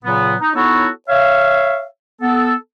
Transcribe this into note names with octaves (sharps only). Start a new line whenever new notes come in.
A#2 C#3 F#3 B3
D#4
B3 D#4 E4 F#4 A4 C#5
C#5 E5 F5
B3 A4